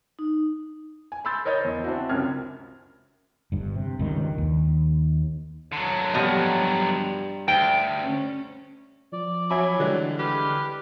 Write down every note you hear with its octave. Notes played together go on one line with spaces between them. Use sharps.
D#4
G#5
B5 C6 E6 G6 A6
A#4 C#5 D#5 B5 G6 A6
E2 C5
C4 D4 E4 F#4
C#2 F#2 C3 F6 G#6
G1 G2
C3
C#2 G2 D#3
D#2
D3 F#3
G2 F3 B3 D#5
D2 G5
C#4
F3 D5
F#3 E5 G#5 B5
D3 E3 G3 G#3
G4 B4 F6